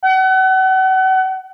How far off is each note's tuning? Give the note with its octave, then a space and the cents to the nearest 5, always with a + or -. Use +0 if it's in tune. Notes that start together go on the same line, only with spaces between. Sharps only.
F#5 +35